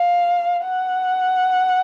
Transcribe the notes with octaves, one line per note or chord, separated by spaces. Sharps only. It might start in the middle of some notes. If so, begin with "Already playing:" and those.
Already playing: F5
F#5